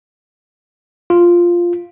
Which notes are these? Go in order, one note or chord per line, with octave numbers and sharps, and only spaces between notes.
F4